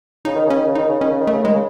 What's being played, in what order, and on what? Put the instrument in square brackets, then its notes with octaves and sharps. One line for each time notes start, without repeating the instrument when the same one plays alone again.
[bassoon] C#3 [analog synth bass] D#4
[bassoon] D#3
[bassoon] C#3 [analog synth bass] C#4
[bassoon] D#3
C#3
[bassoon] D#3 [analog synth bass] D#4
[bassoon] C#3
[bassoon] D#3 [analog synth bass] C#4
[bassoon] C#3
D#3
[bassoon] C#3 [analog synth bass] A3
[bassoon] D#3 [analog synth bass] G#3
[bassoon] C#3